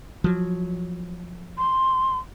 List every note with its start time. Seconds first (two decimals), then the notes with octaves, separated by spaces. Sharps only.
0.24 F3 F#3
1.58 C6